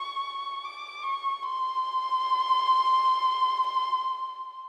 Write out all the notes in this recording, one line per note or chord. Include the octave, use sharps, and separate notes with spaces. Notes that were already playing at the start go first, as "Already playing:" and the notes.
Already playing: C#6
D6
C#6
C6